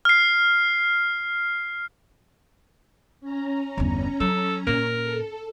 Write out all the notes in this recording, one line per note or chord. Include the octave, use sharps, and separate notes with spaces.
F6 C7
C#4 A#5
G1 E2
F#3 A4
A#2 A#4
A4